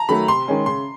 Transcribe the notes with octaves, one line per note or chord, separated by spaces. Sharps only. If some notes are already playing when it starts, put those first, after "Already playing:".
Already playing: A5 A#5
D#3 F#3 A3 B5
C3 C6
D#3 G#3 C#4
C#3 C6